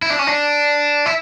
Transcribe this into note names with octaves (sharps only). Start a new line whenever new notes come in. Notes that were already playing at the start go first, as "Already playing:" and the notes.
E4
D4
C#4
D4
E4